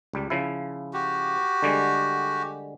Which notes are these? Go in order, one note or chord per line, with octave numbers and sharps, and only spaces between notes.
C#2 G3
C#3 F3 E4
F#4 G4
D3 G3 G#3